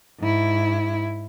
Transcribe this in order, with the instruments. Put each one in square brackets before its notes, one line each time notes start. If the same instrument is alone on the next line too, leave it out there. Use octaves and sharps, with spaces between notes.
[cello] G#2 E4